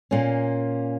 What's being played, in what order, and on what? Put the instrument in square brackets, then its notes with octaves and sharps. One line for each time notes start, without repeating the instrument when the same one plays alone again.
[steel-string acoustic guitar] A#2 A#3 C#4